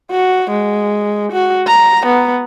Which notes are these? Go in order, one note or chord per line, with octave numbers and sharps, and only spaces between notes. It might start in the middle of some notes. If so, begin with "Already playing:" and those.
F#4
G#3
F#4
A#5
B3